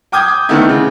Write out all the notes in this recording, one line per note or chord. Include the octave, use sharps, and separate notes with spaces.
G5 D6 D#6 G6 G#6
D3 D#3 A3 B3 D#4 E4
C#3